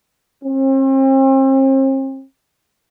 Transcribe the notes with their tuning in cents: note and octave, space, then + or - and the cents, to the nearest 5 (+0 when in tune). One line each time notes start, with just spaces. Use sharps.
C4 +40